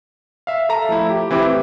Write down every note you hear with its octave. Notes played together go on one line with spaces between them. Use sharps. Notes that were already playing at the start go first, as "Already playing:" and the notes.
E5 F5
A4 E5 A5 A#5
F3 A3 E4
G4
E3 C4 E4 G4
A2